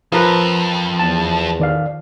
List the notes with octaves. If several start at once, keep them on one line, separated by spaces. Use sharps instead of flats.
F2 F3 A#4 B4
E2 A5
D#3 D5 F5